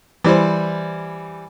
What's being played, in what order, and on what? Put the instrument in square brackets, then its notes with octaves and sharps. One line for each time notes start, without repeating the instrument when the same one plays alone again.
[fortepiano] E3 G3 C5